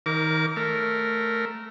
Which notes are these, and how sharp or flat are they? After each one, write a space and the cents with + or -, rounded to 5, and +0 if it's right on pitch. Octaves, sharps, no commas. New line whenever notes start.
D#3 +25 A#4 +0 D6 -30
A3 +0 A#4 -5